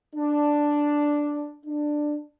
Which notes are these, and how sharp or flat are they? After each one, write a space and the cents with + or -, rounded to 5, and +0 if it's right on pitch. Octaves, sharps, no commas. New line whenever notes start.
D4 +0
D4 +15